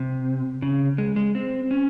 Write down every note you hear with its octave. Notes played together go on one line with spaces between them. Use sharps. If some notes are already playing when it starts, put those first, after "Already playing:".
Already playing: C3
C#3
G#3
G#3
C4
C#4